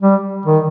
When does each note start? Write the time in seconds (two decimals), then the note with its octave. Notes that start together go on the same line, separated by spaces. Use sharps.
0.02 G3
0.46 D#3